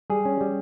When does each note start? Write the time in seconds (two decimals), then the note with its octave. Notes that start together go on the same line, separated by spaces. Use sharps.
0.10 G3 G#4
0.25 C#4
0.41 G3